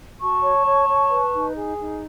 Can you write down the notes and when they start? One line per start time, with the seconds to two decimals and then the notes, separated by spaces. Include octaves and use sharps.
0.20 F#4 A5 C#6
0.43 C#5
0.65 C#5
0.87 C#5
1.10 B4
1.33 D#4
1.54 G#4
1.77 D#4